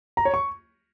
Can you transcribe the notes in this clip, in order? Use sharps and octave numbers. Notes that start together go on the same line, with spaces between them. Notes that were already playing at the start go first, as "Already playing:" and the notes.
A#5
C#5
C#6